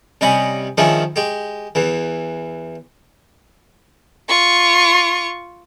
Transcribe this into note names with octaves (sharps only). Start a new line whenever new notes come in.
C3 G3 C#4 D#5 G#5 B5
D#3 F3 G#3 C#4 D4 E4
G#3 G4
E2 E3
F4 C#6